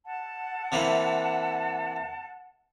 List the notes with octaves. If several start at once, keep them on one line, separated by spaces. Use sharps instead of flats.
F#5 A5
C3 E3 A#3